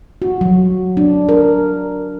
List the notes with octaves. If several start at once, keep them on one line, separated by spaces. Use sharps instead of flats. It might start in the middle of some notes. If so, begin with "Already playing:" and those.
F#4
F#3
D4
A#4